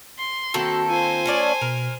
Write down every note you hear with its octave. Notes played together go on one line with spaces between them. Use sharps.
C6
D#3 A#3 C4 F#4 A4
F4 C5 G#5
A3 C#4 D5
B2 A#4